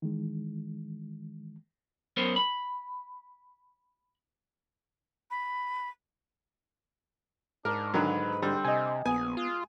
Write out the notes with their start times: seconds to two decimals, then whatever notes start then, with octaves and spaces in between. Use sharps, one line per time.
0.02 D#3 E3 G#3
2.17 F#2 B3 A#4 C5 C#5
2.36 B5
5.31 B5
7.65 G#2 D4 A#4
7.94 D3 D#3 F#3 B4
8.42 D3 G3 C4
8.65 C3 D#5 G#5
9.06 A#1 B3 G#4 G#5
9.37 G#3 F4